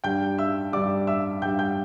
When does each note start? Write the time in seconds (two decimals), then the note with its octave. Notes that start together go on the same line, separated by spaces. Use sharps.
0.04 G2 G3 G5 G6
0.38 E5 E6
0.73 G2 G3 D5 D6
1.07 E5 E6
1.42 G2 G3 G5 G6
1.59 G5 G6